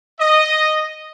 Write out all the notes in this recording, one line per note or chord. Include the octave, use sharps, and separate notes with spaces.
D#5